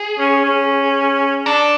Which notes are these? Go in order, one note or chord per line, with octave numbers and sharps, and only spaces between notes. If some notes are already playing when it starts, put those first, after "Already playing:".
Already playing: G#4
C#4
C#4
D4 A4